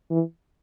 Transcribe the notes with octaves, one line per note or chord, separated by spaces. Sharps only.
E3